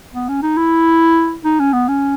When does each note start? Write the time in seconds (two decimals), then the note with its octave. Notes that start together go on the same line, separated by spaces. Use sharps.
0.13 B3
0.29 C#4
0.43 D#4
0.58 E4
1.44 D#4
1.60 C#4
1.73 B3
1.88 C#4